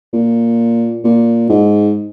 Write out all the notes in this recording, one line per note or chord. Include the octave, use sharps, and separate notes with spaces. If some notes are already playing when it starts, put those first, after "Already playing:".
A#2
A#2
G#2